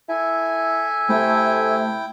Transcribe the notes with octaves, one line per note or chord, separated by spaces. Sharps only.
E4 A4 E5 G#5
C3 A3 E4 G5